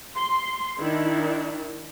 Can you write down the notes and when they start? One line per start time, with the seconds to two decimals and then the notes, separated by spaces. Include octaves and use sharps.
0.15 C6
0.79 D#3 D4 E4